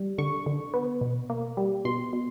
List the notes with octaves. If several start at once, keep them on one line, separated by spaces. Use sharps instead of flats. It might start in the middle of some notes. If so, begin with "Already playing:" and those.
Already playing: G3
D3 C#6
D3
B3
B2
A#3
G3
B2 C6
B2